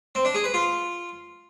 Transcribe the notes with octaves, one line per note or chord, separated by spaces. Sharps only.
C4
D4
G#4
B4
F4